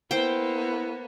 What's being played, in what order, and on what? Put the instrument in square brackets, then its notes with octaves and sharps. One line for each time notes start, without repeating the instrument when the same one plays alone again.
[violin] A#3 B3 [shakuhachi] E4 [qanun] C5 G5